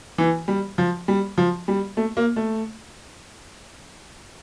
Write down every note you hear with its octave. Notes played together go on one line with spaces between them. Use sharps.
E3
G3
F3
G3
F3
G3
A3
A#3
A3